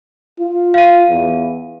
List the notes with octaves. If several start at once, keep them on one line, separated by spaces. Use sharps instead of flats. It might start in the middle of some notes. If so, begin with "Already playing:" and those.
F4
F5 D#7
E2